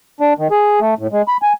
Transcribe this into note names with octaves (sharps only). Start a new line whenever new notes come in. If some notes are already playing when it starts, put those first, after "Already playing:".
D4
D#3
G#4
A3
A2
G#3
B5
G#5